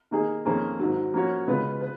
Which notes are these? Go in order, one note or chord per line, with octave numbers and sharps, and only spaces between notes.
D#3 A#3 D#4 G#4
F2 D#3 A#3 C#4 G#4
G#2 D#3 F#3
F3 A#3 C#4 F#4 C#5
C#3 G#3 B3 F4 B4
B4